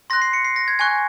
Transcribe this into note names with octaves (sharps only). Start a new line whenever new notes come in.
C6 F#6 A#6
C7
C#7
C7
A#6
G#6
G#5 C#6 F#6 G#6